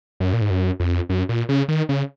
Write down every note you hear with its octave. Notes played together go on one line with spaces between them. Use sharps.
F#2
A#2
G#2
F#2
F2
F#2
A#2
C#3
D#3
C#3